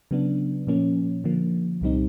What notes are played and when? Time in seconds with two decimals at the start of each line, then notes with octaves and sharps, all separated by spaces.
0.11 C#3 F#3 B3 D4
0.67 A#2 F3 A#3 C#4
1.24 D3 F3 A#3
1.81 C2 A#2 G3 C4 D#4